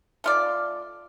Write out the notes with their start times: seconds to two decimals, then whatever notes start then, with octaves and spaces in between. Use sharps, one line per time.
0.24 A3 F4 D5